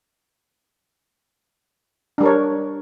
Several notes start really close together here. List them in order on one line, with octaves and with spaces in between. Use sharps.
D4 G3 A#4 C#5